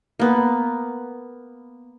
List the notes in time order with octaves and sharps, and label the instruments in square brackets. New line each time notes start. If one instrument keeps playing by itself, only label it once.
[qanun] A#3 B3